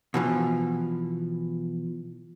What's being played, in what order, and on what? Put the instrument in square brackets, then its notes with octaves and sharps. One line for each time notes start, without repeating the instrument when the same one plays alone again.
[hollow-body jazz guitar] B2 E3 F3